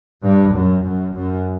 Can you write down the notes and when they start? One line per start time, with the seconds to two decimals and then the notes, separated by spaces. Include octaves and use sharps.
0.24 G2
0.55 F#2
0.86 F#2
1.16 F#2